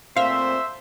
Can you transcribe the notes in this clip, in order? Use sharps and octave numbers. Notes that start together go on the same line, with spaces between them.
A#2 A3 C4 C5 E5 F5